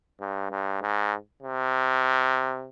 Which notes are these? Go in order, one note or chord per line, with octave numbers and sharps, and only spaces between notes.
G2
G2
G#2
C3